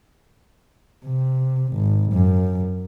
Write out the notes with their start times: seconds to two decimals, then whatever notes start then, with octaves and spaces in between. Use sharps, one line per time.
1.06 C3
1.74 G#1
2.13 F#2